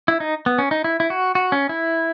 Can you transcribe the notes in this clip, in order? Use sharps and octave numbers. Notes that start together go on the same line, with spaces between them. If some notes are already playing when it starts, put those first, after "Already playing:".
E4
D#4
B3
C#4
D#4
E4
E4
F#4
F#4
C#4
E4